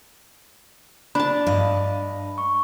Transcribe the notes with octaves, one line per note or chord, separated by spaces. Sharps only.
D4 A5 B5
G2 D#5
C#6